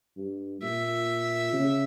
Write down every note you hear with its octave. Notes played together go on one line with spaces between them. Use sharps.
G2
A#2 E5
C#3